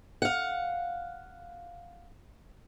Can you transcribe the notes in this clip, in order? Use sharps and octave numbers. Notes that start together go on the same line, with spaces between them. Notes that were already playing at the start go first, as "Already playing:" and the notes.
F5 F#5